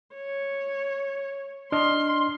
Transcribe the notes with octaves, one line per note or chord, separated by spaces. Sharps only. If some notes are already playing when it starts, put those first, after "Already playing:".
C#5
D4 D#5 C6 F6